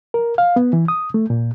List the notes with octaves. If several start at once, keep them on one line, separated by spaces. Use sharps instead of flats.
A#4
F5
B3
E3
D#6
A3
A#2